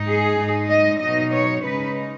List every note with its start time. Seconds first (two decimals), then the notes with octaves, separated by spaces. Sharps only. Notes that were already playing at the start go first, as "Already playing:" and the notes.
Already playing: G#2 G#3 D#4
0.08 G#4
0.39 G#2 G#3 D#4
0.70 D#5
1.01 B2 F#3 D#4 D#5
1.33 C#5
1.64 C#3 G#3 D#4 B4